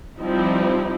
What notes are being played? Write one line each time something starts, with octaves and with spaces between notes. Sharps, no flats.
F3 G3 C4 D#4 E4